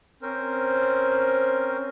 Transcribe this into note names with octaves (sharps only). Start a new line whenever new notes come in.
C4 C#4 A#4 C5